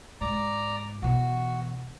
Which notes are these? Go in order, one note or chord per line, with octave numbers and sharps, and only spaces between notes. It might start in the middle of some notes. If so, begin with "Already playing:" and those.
G#2 D5 A#5
B2 E3 F#4